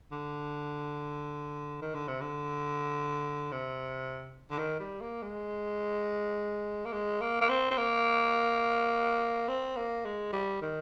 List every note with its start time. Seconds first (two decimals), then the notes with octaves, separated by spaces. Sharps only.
0.12 D3
1.81 D#3
1.94 D3
2.08 C3
2.21 D3
3.52 C3
4.50 D3
4.58 D#3
4.80 G3
5.01 A#3
5.22 G#3
6.85 A#3
6.92 G#3
7.21 A#3
7.41 A#3
7.49 C4
7.71 C4
7.77 A#3
9.48 C4
9.76 A#3
10.05 G#3
10.32 G3
10.62 D#3